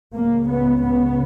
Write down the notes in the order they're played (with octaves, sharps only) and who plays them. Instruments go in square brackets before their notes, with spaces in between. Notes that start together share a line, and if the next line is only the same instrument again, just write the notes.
[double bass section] C#2 C#3 A#3
B3
B3